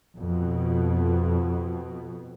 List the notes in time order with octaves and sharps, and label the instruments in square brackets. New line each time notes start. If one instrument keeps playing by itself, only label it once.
[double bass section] F2 B2